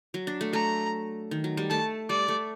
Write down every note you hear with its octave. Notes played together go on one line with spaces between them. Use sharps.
F#3
D4
A3
A3 A#5
D#3
F#3
G3
A3 A5
G3 D5
A3